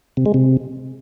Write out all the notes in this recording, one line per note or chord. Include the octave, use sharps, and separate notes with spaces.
C3
G#3
C3